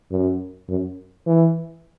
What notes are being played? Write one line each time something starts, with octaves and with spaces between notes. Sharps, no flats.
F#2
F#2
E3